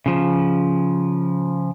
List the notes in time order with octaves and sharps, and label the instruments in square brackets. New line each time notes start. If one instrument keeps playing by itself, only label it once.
[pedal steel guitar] C#3 F3